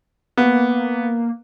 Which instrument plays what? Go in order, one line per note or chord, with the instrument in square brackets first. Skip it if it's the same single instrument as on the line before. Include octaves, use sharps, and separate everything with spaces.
[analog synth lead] A#3 [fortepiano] B3